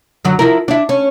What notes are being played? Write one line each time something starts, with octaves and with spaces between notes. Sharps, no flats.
F#2 D3 F#3
F3 E4 A#4
D4 E4
C#4